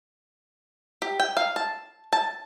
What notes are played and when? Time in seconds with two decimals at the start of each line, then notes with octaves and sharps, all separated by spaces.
1.02 G4
1.20 G5
1.37 F5
1.56 A5
2.13 A5